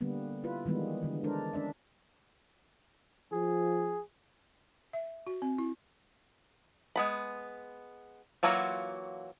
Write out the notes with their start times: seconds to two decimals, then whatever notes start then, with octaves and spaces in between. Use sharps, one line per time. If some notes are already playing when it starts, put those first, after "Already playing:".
0.01 D3 G3 A#3 B3
0.44 E4 F4 B4
0.66 D#3 E3 G3 G#3 B3
1.03 D3 E3
1.24 G#3 D4 A#4 C5
1.53 C#4 D4 D5 E5
3.32 F3 G#4
4.93 E5
5.27 F#4
5.42 C4
5.58 E4
6.96 G#3 B3 B5
8.43 E3 F#3 A#3 F4 F#4